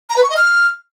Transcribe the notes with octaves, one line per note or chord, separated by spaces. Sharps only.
A#5
B4
C#6
D#5
F6